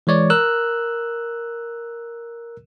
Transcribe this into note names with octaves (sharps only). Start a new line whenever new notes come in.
E3 G#3 C#5 D5
A#4 E6 F#6